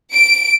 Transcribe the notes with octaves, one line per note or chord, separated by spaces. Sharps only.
D7